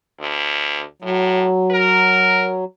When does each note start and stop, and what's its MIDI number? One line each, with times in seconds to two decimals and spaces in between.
0.20 0.82 38
1.02 1.47 45
1.02 2.64 54
1.71 2.53 70